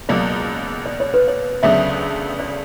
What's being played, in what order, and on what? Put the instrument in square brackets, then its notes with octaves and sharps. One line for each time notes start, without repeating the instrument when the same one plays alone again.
[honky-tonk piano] C#2 B2 F#3 A#3 [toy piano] D5
[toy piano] D5
C#5
B4
C#5
[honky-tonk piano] D2 C#3 F#3 B3 D4 [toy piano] E5
[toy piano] D5